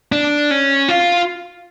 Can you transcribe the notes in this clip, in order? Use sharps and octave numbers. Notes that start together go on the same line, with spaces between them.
D4
C#4
F4